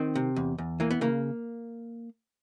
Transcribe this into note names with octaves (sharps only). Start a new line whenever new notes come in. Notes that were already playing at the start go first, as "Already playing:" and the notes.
Already playing: D#3 C4
C3
E2
E2
E3 A#3
B3
C#3 A#3